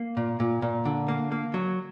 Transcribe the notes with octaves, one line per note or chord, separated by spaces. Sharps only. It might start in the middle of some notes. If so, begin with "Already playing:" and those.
Already playing: A#3
A#2
A#2
A#2
D3
A#3
A#3
F#3